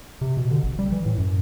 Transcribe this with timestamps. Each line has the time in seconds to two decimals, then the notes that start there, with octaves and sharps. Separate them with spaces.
0.21 C3
0.37 B2
0.51 D3
0.63 A1
0.79 G3
0.92 E3
1.06 A2
1.18 F#2